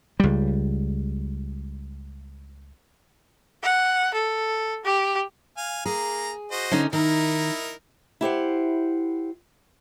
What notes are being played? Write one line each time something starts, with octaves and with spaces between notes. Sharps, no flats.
C#2 G3
F#5
A4
G4
F5 G#5
A#3 G#4 A#5
F#4 C5 D#5
D3 C#4 D#4
D#3 D#4 E4 A#4
E4 G4 C5 F#5